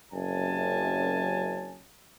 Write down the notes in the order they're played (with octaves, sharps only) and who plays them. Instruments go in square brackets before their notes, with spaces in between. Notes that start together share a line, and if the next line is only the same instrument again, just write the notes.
[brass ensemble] F#1 F#2 C3 C#4 G#5 A5